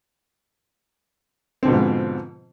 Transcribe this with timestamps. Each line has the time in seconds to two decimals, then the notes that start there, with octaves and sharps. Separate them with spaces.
1.63 C4
1.65 D3
1.68 B2
1.70 F3
1.73 G#2